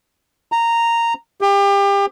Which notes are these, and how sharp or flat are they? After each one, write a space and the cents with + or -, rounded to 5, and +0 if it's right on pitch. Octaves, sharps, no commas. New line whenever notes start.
A#5 -10
G4 +30